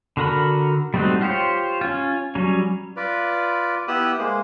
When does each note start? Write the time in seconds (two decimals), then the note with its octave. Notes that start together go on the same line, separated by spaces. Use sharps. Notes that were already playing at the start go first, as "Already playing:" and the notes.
0.17 D3 F#4 A#4 B5
0.94 G3 A3 C4 D#4 F#4
1.21 F4 G4 C5 C#5
1.81 C#4 F4
2.35 F#3 G3 C#4
2.96 F4 B4 D5
3.88 B3 E4 G4 D#6 E6 F#6
4.19 G#3 A#3 C5